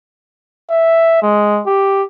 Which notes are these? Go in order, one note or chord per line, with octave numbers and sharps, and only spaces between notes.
E5
G#3
G4